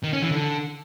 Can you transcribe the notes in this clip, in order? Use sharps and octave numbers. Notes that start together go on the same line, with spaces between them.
D#3
C#4
E3
D3